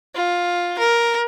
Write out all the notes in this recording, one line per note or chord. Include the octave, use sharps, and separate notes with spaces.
F4
A#4